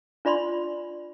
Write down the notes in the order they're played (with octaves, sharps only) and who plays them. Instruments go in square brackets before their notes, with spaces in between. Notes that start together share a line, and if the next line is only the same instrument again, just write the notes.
[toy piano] D4 F4 D5 B5 C6